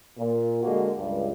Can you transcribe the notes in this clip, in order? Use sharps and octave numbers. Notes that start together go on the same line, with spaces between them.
A#2
D3 G#3 A#3 F#4
C#2 G2